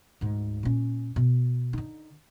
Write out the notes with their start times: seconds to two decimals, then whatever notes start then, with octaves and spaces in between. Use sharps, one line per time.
0.21 D2 G#2
0.63 A#2 C#4
1.16 B2
1.73 D3 D#4